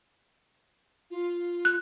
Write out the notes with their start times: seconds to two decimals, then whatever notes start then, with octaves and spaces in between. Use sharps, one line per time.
1.11 F4
1.65 F#6